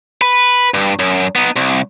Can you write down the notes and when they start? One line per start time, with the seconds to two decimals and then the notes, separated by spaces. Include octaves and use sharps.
0.21 B4
0.74 G2
0.99 F#2
1.35 B3 D#4
1.56 C2